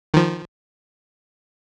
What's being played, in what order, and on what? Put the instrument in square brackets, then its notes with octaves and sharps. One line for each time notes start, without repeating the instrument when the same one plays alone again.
[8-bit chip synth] D#3 F3